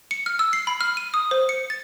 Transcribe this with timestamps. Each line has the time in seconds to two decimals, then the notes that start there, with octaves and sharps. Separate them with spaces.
0.11 C#7
0.26 F6
0.39 E6
0.53 C7
0.67 B5
0.81 F6
0.97 D#7
1.14 D#6
1.31 C5
1.49 C#7
1.70 A6